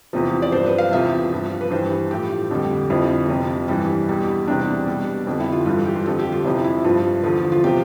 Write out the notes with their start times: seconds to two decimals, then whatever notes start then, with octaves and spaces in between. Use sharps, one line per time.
0.13 E2 C3 F3
0.42 D5
0.52 G2 F3 C5
0.66 B4
0.78 F5
0.92 E2 C3 F3 E5
1.32 G2 F3
1.61 B4
1.71 G2 E3 G3 C5
2.11 A2 F3 G4
2.51 F2 D3 G3
2.90 F2 D3 F3 E4
3.29 F2 C3 F3
3.68 G2 E3 G3
4.08 E2 B2 G3
4.48 E2 C3 G3 D4
4.87 B2 G3
5.27 F2 D3 G3
5.40 E4
5.52 F4
5.66 G2 E3 G3 F4
5.76 A4
5.85 G4
5.96 F4
6.06 F2 D3 F3 A4
6.19 G4
6.32 F4
6.45 F2 C3 F3 E4
6.64 E4
6.84 G2 F3 F4
7.24 E2 D3 F3
7.52 F4
7.64 C3 F3 G4